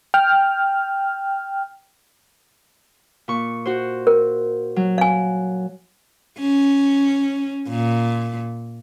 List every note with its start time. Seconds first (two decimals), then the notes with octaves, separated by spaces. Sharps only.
0.14 G5 F6
3.28 A#2 C#6
3.66 F#4 C5
4.07 A#4
4.76 F#3
4.98 F5 G#5
6.40 C#4
7.69 A#2